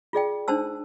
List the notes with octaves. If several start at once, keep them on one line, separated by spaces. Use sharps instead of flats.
F4 G#4 D5 G5
D4 D#4 C5 A5 E6